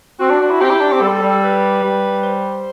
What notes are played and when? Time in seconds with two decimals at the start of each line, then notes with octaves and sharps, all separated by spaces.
0.20 C4 F#4
0.30 D4
0.41 D4
0.51 E4
0.60 C4 G4
0.71 E4
0.81 D4
0.92 C4
1.01 G3 A4
1.22 G3
1.43 B4
1.83 G3
2.23 C5